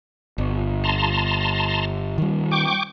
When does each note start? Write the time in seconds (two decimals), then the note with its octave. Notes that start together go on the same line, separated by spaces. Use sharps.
0.38 G1
0.84 A5 A#5 C6
2.18 D#3 G3
2.52 G5 C#6 D6